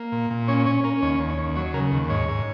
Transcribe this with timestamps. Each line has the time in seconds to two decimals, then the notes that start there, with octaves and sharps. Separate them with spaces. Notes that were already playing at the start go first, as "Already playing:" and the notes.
Already playing: A#3
0.12 A#2
0.30 A#2
0.48 C#4 C#5
0.65 C#4 C#5
0.84 C#4 A#4
1.02 D#2 C#5
1.20 D#2
1.30 C#5
1.38 D#2
1.55 F#3 C#5
1.74 C#3 A#4
1.92 D#2
2.10 G#2 C#5
2.28 G#2